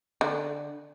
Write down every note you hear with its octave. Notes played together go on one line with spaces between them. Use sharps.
D3